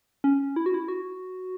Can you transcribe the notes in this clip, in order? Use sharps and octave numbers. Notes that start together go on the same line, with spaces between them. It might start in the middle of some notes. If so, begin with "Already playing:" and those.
C#4
E4
F#4
E4
F#4